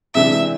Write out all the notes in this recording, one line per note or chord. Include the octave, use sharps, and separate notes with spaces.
C3 E3 G#3 D4 E5